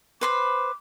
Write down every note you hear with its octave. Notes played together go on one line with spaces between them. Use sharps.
B4 C5 B5 D6